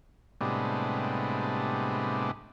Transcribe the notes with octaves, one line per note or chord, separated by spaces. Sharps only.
A2 C3 G3 G#3 B3 D4